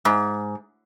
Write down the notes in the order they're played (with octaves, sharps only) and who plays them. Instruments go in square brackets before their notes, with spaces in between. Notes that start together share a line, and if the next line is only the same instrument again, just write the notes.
[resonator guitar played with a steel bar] G#2